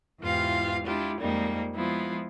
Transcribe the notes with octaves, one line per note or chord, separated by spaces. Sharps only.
E2 G#2 E3 F4 G4 F5
G#3 D4 E4 F4 G4
F2 A#2 G3 G#3 A#3 D#4
F3 G#3 B3 E4 F4